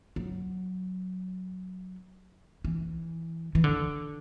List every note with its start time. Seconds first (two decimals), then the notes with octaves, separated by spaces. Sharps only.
0.16 F#3
2.65 E3
3.55 E3
3.64 D3